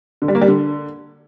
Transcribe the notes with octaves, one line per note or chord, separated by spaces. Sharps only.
D3
G3
A#3
G3
D3